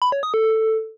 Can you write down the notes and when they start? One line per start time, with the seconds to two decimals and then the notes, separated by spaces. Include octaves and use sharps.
0.02 B5
0.12 C#5
0.23 D#6
0.34 A4